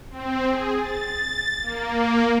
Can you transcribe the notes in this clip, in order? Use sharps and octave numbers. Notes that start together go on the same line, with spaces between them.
C4
G#4
A6
A#3